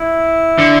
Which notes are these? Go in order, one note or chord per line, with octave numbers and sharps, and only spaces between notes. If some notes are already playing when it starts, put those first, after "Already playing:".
Already playing: E4
D3